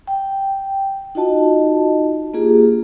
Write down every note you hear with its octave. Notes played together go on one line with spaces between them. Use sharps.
G5
D#4 F4 F#4 D#5 A5
A#3 D4 F4 G4 G#4